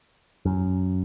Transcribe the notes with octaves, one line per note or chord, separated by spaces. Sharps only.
F#2